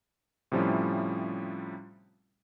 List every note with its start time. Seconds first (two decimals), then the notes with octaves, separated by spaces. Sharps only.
0.52 A2 C3 F3 G3 C#4 E4